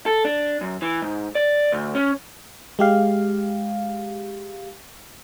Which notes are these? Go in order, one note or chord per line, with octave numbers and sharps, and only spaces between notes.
A4
D4
F#2
E3
G#2
D5
D2
C#4
G#3 G4 F5